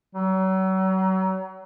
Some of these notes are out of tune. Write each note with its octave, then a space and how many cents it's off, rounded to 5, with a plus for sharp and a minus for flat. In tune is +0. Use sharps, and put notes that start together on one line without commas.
F#3 +35